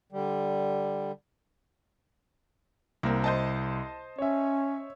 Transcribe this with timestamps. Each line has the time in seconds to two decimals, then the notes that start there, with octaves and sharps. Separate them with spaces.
0.12 D3 G3
3.03 C2 A#3 C4
3.24 C5 D#5 A5
4.19 C#4 C#5 E5